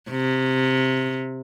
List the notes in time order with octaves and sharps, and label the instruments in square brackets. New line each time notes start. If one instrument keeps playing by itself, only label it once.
[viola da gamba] C3